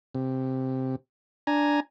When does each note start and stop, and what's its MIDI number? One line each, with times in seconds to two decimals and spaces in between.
0.15 0.96 48
1.47 1.80 62
1.47 1.80 80
1.47 1.80 82